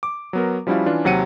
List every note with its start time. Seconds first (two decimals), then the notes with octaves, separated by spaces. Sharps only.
0.03 D6
0.33 F#3 B3 A#4
0.67 F3 G3 C#4 E4 F#4 F5
0.86 E3 C#4 D4 F4
1.04 D#2 C3 F#3 F#5 C#7 D#7